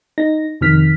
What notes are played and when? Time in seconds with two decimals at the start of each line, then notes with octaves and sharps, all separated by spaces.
0.18 D#4 A#6
0.61 F2 C3 D#3 F6 B6